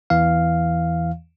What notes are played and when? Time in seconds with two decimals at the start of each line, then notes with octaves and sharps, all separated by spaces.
0.10 E2 E3 F5